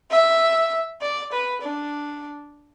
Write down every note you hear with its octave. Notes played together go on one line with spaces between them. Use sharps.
E5
D5
B4
D4